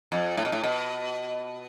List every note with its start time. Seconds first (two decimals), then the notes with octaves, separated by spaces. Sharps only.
0.12 F2
0.37 A2
0.45 B2
0.52 A2
0.63 B2